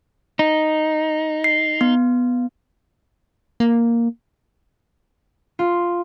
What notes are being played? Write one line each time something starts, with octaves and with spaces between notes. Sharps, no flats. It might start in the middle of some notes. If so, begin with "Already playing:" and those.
D#4
C7
B3
A#3
F4